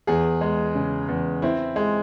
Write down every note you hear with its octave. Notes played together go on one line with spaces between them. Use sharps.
E2 G#4
G#3
C#3
E2
C4 E4
G#3